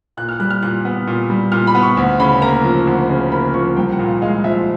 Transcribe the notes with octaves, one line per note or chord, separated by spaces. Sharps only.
A#2 F#6
F6
G3 F#6
F6
A#2 F#6
B3
A#2
G3
A#2 F6
B5
B3
C#6
D2
C#3 B5
A#3 A#5
F3
D2
C#3
A#3 B5
F3 C#6
C2 G5
F#5
A#2
F5
G#3 F5
F3 E5